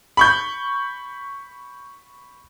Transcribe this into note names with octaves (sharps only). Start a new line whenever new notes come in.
B5 C#6 G6